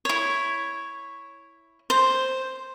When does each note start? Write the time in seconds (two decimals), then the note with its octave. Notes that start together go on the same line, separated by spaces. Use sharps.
0.05 E4 C#5
1.90 C5